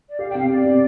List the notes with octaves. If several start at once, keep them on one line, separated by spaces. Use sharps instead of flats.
D5
G4 F5
G5
C3 F5
G4 D5
C3